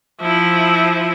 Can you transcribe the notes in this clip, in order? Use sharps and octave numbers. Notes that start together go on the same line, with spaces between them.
F3 E4